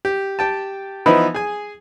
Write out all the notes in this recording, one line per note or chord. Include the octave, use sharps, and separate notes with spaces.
G4
G4 G5 A5
E3 F3 B3 D#4 E4 B4
G#4 G#5